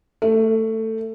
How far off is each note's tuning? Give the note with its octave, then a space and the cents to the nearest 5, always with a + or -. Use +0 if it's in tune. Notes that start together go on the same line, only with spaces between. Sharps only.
A3 +15